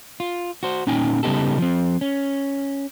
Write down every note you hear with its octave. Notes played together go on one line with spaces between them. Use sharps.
F4
F#4 C5
A#2 C#4 D#4 G5 G#5
C#3 G3 B3 D#4 G4 A4
F3 C4
C#4